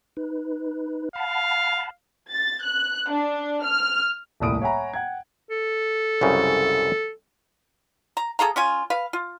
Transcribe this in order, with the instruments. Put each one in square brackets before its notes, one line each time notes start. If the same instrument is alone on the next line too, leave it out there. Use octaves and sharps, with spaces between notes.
[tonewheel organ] D#4 B4
[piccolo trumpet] F5 [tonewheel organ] F#5 A5 B5
[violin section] A6
F#6
D4
F6
[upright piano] D#1 C2 A2 D#6 D7
C#5 E5 F#5 G#5 A#5 B5
F#5 G5 G#6
[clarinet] A4
[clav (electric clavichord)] C2 F#2 C#3
[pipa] A#5
G#4 A4 F5 A#5
C#4 F4 G#5
B4 F5
F4